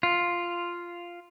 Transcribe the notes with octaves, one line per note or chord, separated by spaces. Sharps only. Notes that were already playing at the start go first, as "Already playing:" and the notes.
F4